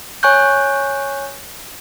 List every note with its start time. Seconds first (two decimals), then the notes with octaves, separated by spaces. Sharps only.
0.23 C#5 G#5 C#6 F#6 G6